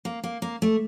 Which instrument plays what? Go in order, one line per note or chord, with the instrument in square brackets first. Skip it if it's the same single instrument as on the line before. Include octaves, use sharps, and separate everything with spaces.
[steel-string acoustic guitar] A#3
A#3
A#3
A3